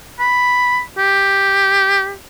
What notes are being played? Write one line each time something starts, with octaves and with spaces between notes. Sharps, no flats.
B5
G4